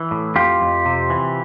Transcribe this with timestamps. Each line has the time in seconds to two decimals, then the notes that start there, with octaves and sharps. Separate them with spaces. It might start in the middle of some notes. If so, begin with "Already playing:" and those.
Already playing: E3
0.11 A2
0.36 F2 F4 G4
0.61 F2
0.86 C3
1.10 E3